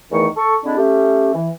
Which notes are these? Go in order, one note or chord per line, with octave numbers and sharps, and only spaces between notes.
E2 D#3 E3 A3 A#4 C#6
A4 C#6
D3 G#3 C4 D4 E4
A3 C#4 G4
E3